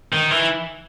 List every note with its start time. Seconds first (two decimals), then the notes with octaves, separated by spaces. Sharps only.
0.13 D#3
0.31 E3